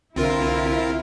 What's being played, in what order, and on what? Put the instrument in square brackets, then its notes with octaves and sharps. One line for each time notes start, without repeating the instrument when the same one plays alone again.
[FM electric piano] C2 D3 [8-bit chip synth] C4 F4 A#4 [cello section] E4